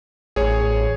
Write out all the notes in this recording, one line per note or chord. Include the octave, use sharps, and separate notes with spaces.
A1 G#4 C#5